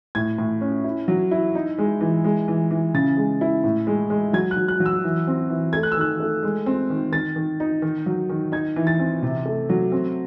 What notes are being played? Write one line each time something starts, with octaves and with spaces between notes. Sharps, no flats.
A2 G#6
A2
C#4
E4
F#3
E4
D#4
G#3
E3
G#3
E3
E3
C#3 A6
G#3
E4
A2
G#3
G#3
F#3 G#6
F#6
F#3
F#6
F#3
E6
E3
C4
E3
A3 G#6
F#6
E6
D#3 F#6
A3
G#3
C4
D#3
D#3 A6
D#3
D#4
D#3
F#3
D#3
D#4 G#6
E3
A6
C4
C3
A3
F#3
C4